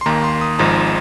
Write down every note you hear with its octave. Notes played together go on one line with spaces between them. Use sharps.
C6
D#2 D#3 A#3 A#5
C6
D#6
G#1 G#2 F3 G#3 A#5